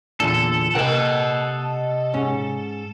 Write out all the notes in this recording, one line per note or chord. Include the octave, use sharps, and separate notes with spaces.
E2 A#2 D3 A4
C3 A#3 A#4 D#5 F#5 G5
G#2 C#4